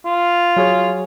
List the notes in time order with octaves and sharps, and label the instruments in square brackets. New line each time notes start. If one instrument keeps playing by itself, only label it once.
[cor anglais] F4
[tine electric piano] F#3 G#4 C#5